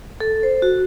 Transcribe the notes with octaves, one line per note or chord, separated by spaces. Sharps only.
A4
C5
F#4